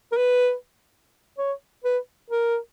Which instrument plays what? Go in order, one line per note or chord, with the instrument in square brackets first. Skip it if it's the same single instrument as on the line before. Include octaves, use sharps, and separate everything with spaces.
[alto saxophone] A#4
B4
C#5
B4
A#4